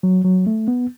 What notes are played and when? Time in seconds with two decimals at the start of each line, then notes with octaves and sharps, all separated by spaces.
0.03 F#3
0.25 F#3
0.47 A3
0.68 B3